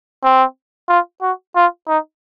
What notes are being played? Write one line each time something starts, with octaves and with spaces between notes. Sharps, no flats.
C4
F4
F#4
F4
D#4